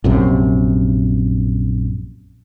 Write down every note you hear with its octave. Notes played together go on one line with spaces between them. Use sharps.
A#1 F#2 C3